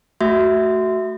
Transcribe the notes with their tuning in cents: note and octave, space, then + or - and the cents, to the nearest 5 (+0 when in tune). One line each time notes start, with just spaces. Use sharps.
A3 +0 F#4 +15 E5 +0